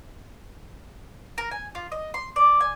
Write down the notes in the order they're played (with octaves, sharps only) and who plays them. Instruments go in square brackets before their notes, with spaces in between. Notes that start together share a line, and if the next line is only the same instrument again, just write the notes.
[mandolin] A#4
G#5
F4
D#5
C6
D5
G#5